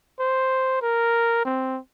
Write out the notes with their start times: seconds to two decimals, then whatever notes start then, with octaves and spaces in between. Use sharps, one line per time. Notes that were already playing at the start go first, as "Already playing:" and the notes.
0.20 C5
0.82 A#4
1.45 C4